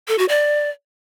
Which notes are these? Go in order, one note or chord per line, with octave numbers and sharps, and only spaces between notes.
A4
F#4
D5